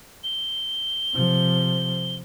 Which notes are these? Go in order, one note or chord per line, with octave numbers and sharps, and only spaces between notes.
G7
C3 F3